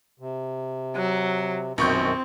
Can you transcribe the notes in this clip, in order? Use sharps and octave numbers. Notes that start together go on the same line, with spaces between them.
C3
F#3
A#1 F#2 B2 D#3 C4 C#6 G6